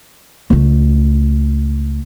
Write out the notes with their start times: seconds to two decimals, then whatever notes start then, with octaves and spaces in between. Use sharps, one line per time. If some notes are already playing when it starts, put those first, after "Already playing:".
0.50 C#2 A3